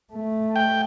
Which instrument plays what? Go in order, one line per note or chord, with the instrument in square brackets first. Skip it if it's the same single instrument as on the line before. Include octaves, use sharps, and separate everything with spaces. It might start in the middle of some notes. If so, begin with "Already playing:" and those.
[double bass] A3
[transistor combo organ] G5